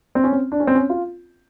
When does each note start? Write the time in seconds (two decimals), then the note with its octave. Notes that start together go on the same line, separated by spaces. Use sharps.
0.15 C4
0.24 C#4
0.32 C4
0.52 D4
0.60 C#4
0.67 C4
0.75 C#4
0.90 F4